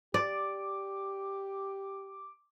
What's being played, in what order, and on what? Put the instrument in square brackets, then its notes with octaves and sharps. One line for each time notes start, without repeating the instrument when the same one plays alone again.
[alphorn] G4 [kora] D5 [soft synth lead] D6